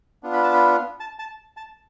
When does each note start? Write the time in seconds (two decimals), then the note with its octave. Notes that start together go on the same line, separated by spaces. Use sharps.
0.23 B3 D4 F4
0.33 B5
0.43 A5
0.54 B5
1.00 A5
1.19 A5
1.57 A5